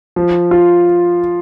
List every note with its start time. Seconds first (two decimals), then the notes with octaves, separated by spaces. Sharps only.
0.16 F3
0.51 F4